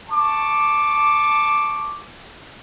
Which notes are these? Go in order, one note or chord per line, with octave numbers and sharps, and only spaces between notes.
A5 C#6 D6